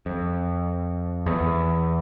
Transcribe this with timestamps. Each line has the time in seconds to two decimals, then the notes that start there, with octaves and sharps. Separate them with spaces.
0.06 F2
1.26 E2